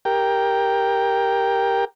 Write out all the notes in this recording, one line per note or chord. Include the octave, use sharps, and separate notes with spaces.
G4 A#4 G5